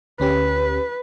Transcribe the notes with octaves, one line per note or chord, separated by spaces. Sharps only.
D2 C#4 G4 B4